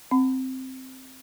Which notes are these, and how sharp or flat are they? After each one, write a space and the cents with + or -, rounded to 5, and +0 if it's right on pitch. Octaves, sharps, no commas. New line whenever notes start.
C4 +0 F#5 +0 B5 +30